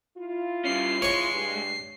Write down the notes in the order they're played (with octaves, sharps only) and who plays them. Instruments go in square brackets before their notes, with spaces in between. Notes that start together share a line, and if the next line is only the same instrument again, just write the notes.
[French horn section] E4 F4
[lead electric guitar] G3 C#4 [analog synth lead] C7
[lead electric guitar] G#3 [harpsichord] C#5 C#6
[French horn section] G2